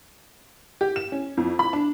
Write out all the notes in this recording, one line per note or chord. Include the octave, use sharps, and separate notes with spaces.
G4
E7
C#4
F2
B5
D4